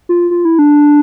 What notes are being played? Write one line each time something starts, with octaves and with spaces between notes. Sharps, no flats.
F4
F4
E4
D4